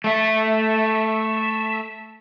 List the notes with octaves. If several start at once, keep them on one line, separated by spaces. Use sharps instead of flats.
A3 E5